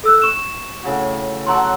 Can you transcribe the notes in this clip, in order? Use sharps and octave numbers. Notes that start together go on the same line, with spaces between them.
A4 E6 F#6
C#6 E7
A2 C#3 F#4
F#3 F#5 A5 A#5 C6 C#6